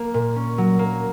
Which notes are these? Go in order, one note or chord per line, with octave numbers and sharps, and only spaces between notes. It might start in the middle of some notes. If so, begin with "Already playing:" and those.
Already playing: A#3
A#2
C#4
F#3
A#3